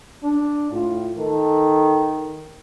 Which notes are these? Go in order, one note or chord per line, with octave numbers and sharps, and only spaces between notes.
D4
A2 F4
D#3 A4